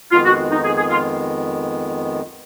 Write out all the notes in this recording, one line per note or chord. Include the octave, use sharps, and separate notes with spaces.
F2 D#3 G#3 B3 F4
F#4
D#4
G#4
G#4
F4